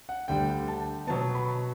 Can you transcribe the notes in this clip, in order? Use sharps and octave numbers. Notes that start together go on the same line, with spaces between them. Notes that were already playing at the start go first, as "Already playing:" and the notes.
F#5
D2 D3 G3 G5
A5
B2 F#3 B3 A5
B5